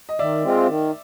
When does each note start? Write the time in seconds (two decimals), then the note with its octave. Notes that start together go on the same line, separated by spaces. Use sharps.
0.09 D#5
0.19 D#3 D5 E5
0.43 G#3 C4 F4
0.67 D#3